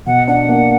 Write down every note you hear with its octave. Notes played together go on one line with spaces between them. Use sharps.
B2 F#5
D4 F#5
A#3